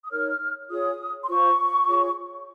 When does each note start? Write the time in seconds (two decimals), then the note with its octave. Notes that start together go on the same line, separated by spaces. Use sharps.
0.03 D#6
0.11 D#4 A#4 C#5 F6
0.70 F4 G#4 C#5 D#6
1.23 C6
1.29 F4 C5 C#6
1.88 F4 G#4 C#5